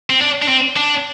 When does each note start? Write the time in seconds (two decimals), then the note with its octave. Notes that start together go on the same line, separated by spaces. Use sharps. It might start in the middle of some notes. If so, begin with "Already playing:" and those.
0.10 C4
0.21 D4
0.42 D4
0.48 C4
0.76 D4